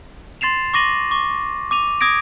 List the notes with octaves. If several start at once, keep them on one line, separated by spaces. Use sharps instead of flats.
C6 A6 C7 E7 F7
C#6 D6 A#6 D#7 F#7
C#6 D6
D6 D#7 F7
D6 D#6 G#6 A#6 D7